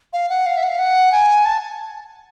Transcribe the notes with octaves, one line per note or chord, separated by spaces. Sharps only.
F5
F#5
F5
E5
F#5
F5
F#5
G#5
A5